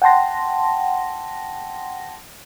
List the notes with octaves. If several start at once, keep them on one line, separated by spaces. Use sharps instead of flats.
F#5 G5 A5 C6 A#6